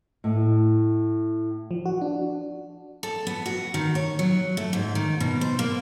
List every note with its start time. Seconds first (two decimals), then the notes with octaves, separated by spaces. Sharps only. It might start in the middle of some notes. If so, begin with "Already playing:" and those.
0.24 A2
1.71 F3
1.86 F#4
2.01 D4
3.03 A4
3.27 B3
3.46 F#4
3.74 D#3
3.95 C#5
4.19 F#3
4.57 A3
4.73 G#2
4.95 D#3
5.20 B2
5.41 C5
5.59 A#3